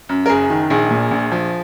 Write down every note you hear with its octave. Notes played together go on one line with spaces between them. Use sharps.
F#2
A#4
F#1 G#4
D#3
A#1 G#4
A#2
A#1
F3